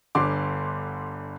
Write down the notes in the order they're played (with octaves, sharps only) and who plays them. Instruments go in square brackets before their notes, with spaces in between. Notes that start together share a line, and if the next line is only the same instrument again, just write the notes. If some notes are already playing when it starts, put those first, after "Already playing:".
[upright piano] G1 D3 C6 D6